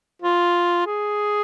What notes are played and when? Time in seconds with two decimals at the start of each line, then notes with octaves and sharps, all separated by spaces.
0.22 F4
0.86 G#4